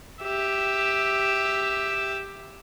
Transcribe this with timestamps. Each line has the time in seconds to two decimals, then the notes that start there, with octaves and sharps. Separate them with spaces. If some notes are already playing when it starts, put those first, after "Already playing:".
0.22 G4 E5